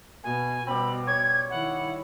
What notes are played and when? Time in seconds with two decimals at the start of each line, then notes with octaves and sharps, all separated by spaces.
0.24 B2 G#5
0.67 B2 G3 C4 B5
1.07 C#5 G#6
1.50 D#3 E4 F#5